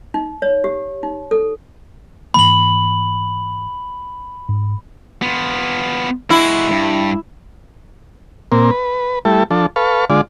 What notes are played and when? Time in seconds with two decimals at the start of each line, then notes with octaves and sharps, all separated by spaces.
0.14 D#4
0.42 C#5
0.64 G4
1.03 D#4
1.31 A4
2.34 G#2 E3 A#3 B5 F#7
4.49 G#2
5.22 B3 F4
6.30 G#3 E4 F#4
6.71 G2
8.52 A#2 A#3 C4
8.71 B4
9.25 G3 A3 E4 A4
9.51 F3 D4 A4
9.76 A4 B4 F5 C#6
10.10 D3 G#3 F4 D5